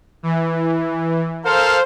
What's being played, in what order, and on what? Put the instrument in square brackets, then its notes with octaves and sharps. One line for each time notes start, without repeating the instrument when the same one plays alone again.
[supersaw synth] E3
[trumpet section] A4 A#4 F5 [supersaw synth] C5